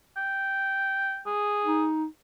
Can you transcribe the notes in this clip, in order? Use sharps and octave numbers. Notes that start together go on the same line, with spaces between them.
G5
G#4
D#4